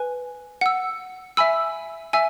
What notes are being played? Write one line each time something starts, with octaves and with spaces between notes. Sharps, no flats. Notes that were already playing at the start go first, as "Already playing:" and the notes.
Already playing: B4 G#5
F#5 E6
E5 G#5 B5 E6
E5 G#5 E6